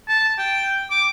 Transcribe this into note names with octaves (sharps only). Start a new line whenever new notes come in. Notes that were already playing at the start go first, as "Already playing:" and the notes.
A5
G5
D6